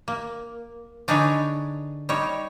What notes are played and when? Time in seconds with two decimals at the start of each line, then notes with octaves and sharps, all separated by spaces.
0.08 A#3
1.08 D3 D4 D#4 G#4 B4 C#5
2.09 G3 D#4 C#5